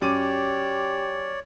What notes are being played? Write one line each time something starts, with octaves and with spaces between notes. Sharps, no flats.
F#2 G4 C#5 D5 D6 D#7